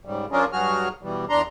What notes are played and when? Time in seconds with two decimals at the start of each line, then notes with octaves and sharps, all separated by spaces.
0.05 G#2 C#3 G3
0.32 F3 C#4 D4 F4 G#4 A#4
0.52 G2 F#3 F#4 G#4 F6
1.03 B2 E3 G3
1.29 E2 D4 A#5 C6